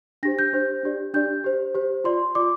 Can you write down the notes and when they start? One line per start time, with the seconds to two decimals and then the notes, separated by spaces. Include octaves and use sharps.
0.23 D4 G4 C5 A#6
0.39 G6
0.53 D4 G4 C5
0.83 D4 G4 D5
1.14 D4 G4 D5 G6
1.44 G4 C5
1.75 G4 C5
2.04 F4 D5 C6
2.35 F4 D5 D6